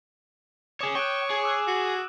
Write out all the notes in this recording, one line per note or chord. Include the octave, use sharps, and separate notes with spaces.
G#4 C#5 D6 D#6 E7
C#5 G5 F#6 D7 D#7
G#4
D6 E6 F#6
F#4